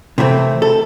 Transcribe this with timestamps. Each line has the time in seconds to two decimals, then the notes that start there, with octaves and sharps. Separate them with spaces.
0.18 C3 E3 A3 C4
0.62 A4